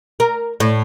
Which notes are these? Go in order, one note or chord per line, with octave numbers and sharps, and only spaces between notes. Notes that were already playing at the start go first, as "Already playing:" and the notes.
A#4
A2